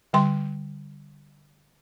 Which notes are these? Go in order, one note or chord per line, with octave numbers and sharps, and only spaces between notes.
D3 G3 G5 C6